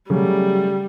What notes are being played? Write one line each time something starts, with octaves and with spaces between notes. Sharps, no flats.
C#3 F#3 G3 A3